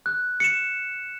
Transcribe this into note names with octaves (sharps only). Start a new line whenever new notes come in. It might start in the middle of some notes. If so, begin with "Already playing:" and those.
F#6
C#7 E7